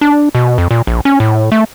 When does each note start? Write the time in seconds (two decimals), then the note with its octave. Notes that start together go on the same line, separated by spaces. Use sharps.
0.01 D4
0.35 B2
0.58 F2
0.71 A#2
0.87 A#1
1.05 C#4
1.20 A2
1.52 A3